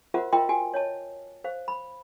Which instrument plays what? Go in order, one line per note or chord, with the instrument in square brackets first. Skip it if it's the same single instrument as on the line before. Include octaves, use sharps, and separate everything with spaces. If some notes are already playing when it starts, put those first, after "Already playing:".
[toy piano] F4 F#4 A#4 C5 E5 F#5
F4 A#4 D#5 E5 G5 C6
F#4 G5 G#5
C#5 D#5 A5
C5 F5
B5